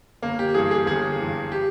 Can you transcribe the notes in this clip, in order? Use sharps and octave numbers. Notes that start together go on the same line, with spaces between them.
G1 A#3
G4
G2 E3 G#4
G#4
G1 G#4
G2 E3
G4